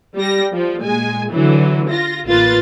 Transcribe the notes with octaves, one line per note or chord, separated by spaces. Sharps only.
G3 A#6
F3
A#2 G#3 G#5
D3 E3 F#3
F4 A#6
A1 A#3 F4 B4 A6